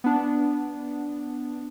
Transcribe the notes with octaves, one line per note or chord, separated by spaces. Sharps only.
B3 D4